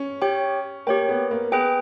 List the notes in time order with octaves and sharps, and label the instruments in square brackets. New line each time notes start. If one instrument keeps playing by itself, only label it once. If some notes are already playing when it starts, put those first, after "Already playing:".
Already playing: [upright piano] C#4
[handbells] G4 C#5 G5
[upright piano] A#3 [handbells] G4 C#5 G5
[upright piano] B3
A#3
[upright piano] B3 [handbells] G#4 B4 G5